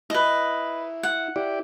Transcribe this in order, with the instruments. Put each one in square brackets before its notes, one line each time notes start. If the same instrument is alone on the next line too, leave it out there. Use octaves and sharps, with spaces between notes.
[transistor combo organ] E4 [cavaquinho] B4 D#5
[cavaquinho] F#5
[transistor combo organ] E4 G4 D5